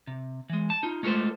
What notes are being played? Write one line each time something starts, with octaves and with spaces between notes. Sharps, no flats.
C3
E3 G#3
A5
D#4 F4
G#3 A3 F4 A4 B4 C5